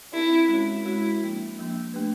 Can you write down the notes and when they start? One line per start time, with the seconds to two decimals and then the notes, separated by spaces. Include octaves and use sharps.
0.12 C4 D#4 E4 G4 A#4 D5
0.48 G#3 C#4 F#4 A#4 C#5
0.85 G#3 C#4 E4 F#4 A#4 C#5
1.22 F3 A#3 D4
1.59 F3 A#3 D4
1.94 A3 D4 G4 B4